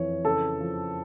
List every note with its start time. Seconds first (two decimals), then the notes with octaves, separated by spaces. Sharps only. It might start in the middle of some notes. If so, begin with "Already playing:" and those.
Already playing: F2 E3 C#5
0.25 C#3 A4
0.61 F3